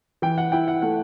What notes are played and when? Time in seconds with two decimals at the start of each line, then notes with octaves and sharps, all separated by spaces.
0.22 E3 G5
0.38 F#5
0.52 E4 G5
0.68 F#5
0.82 A3 F#5